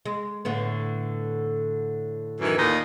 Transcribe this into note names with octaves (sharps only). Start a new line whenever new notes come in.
G#3
A2 D3 B3
F#2 D#3 E3
D#2 A#2 D#4